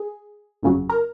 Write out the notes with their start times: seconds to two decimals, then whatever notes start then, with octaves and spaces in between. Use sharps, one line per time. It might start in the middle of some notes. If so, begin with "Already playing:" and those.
Already playing: G#4
0.63 G1 F2 C#3 F#3
0.89 A#4